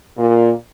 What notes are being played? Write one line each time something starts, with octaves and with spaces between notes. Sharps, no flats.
A#2